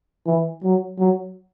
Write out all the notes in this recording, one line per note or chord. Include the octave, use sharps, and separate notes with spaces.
E3
F#3
F#3